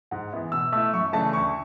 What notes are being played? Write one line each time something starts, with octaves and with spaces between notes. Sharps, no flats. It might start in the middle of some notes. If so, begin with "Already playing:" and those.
G#2 F#5
E3 B3 E4
B2 E6
A3 E4 E6
F#2 C#6
C#3 E3 A3 D4 A5
D2 C#6